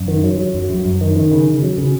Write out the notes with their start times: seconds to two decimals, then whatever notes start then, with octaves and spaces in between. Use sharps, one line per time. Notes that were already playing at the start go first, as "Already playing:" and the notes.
Already playing: F#2
0.08 D#3
0.24 F#3
0.39 F#3
0.55 F#2
0.70 F#2
0.85 F#2
1.01 D#3
1.16 D#3
1.31 C#3
1.48 C#3
1.62 F#3
1.78 C#3